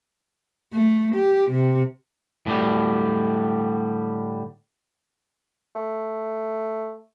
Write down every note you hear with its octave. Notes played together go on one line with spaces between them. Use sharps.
A3
G4
C3
A2 D3 G3
A3